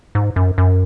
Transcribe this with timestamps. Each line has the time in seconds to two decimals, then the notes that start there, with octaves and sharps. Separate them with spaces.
0.15 G#2
0.36 F#2
0.58 F#2